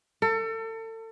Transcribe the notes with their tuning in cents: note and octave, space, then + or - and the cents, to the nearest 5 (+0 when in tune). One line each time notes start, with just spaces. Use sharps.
A4 +35